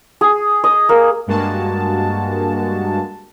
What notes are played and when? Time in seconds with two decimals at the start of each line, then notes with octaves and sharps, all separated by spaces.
0.21 G#4
0.64 D#5
0.89 A#3
1.27 G2 G#3 A#3 F#4 A5